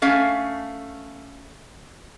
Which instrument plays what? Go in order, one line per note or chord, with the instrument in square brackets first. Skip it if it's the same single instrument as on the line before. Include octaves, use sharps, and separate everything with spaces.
[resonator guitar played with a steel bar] A3 C#4 F5 G#5